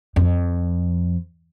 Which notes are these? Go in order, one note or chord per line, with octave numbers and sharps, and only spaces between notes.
F2